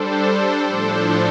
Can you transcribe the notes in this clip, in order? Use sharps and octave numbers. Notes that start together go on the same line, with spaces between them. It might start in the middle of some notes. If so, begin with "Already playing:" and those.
Already playing: G3 D4 A4 C5
A2 F3 D4 A4 C5